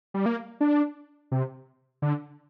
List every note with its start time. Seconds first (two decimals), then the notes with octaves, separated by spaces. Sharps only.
0.14 G3
0.26 A#3
0.61 D4
1.32 C3
2.02 D3